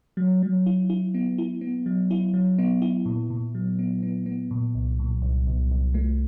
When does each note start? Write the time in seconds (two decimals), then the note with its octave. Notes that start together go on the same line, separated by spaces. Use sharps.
0.17 F#3
0.42 F#3
0.66 E4
0.90 E4
1.14 B3
1.38 E4
1.61 B3
1.86 F#3
2.11 E4
2.34 F#3
2.58 B3
2.82 E4
3.06 A#2
3.30 A#2
3.55 F#3
3.79 B3
4.03 B3
4.26 B3
4.51 A#2
4.75 C2
4.99 A#2
5.22 C2
5.47 C2
5.71 C2
5.94 A3